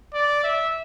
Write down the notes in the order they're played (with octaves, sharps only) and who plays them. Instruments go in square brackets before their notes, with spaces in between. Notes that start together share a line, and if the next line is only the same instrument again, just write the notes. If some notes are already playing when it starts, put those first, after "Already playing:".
[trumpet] D5
E5